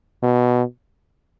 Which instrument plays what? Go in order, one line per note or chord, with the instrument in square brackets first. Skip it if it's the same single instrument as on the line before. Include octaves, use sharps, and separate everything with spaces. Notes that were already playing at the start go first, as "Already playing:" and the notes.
[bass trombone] B2